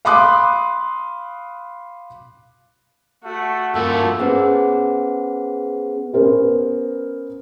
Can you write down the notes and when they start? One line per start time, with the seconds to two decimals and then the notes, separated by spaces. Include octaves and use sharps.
0.05 F5 B5 C6 D6 D#6 F#6
3.25 A3 F#4
3.75 G2 A3 A#3 F4 F#4 A4
4.19 B3 C#4 G#4 B4 C5 F#5
6.14 B3 C#4 A#4 C5